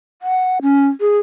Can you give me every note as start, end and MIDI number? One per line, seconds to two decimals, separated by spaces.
0.22 0.58 78
0.62 0.87 61
1.01 1.18 68